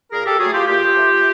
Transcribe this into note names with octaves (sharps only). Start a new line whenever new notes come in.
A#2 G#4 A#4
G4 A4
F#3 A3 F#4 G#4
F4 G4
A#2 F4 G4
F3 A3